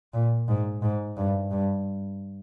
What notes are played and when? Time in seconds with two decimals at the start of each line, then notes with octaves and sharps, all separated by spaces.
0.14 A#2
0.48 G#2
0.82 G#2
1.17 G2
1.51 G2